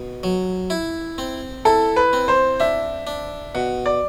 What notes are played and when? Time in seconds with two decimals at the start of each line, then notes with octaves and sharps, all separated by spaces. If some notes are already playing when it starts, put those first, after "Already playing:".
Already playing: B2
0.23 F#3
0.70 E4
1.18 C4
1.65 E4 A4
1.96 B4
2.13 C4
2.28 C5
2.60 D4 E5
3.07 D4
3.55 B2 F#5
3.86 D5